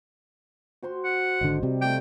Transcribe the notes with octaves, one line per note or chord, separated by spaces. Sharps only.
F#4 C5 C6
F#5
G#1 D3 D#5
C3 G3
G3 A3 A4 G5